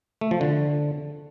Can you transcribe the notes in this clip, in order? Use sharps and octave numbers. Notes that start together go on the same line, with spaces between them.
A3
F3
D3